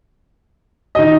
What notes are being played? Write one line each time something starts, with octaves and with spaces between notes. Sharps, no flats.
D#3 D#5